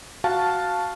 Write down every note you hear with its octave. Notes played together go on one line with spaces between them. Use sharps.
F#4 F5 A5